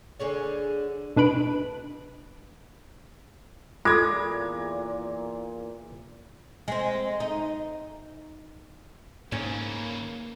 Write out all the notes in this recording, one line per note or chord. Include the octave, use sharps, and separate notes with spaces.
D3 G#4 C#5
B2 D4 B4 B5 D7
E2 A#2 G#3 F4 A4 D6 G#6 A#6
G#3 C4
D#4
G#2 C#3 E3 A#3 C#4